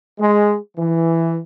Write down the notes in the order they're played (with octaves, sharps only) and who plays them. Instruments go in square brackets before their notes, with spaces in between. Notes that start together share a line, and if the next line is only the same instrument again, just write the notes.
[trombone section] G#3
E3